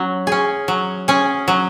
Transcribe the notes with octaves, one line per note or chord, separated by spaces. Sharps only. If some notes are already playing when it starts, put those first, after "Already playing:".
Already playing: F#3 C#4
C#4 G#4
F#3
C#4 G#4
F#3